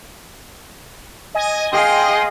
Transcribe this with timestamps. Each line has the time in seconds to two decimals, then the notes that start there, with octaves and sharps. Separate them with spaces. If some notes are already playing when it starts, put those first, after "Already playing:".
1.35 D#5 G#5
1.73 G#4 D#5 F5 G5 C6